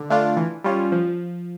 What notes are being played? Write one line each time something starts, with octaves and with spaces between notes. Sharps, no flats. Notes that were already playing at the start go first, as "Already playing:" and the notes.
Already playing: D3
A3 D4 F4
E3
G3 C#4 F4
F3